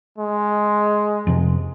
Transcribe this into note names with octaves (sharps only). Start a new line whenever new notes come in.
G#3
F2 C3